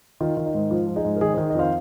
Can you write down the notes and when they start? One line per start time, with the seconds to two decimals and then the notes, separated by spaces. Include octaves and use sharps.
0.21 D#3 F4
0.37 D#3
0.46 D#4
0.54 G#2
0.70 F3 F4
0.87 F3
0.96 D#4 G#4
1.05 G#2
1.17 A#4
1.21 D#3 D#4 G#4
1.34 D#3 G#4 C5
1.50 D#5
1.55 F2 C5 F5